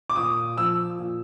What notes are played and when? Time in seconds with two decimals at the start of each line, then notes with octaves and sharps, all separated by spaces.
0.10 D6
0.15 A#2 D#6
0.57 F3 E6
0.99 A#2